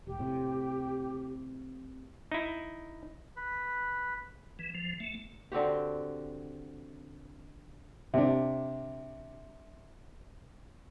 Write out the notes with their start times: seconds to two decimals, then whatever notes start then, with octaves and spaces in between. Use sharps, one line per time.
0.07 E1 G4
0.19 A2 C3
2.31 D#4 E4
3.36 B4
4.59 E3
4.75 F3
5.00 A3
5.52 D3 C4 F#4 G4
8.14 C3 D4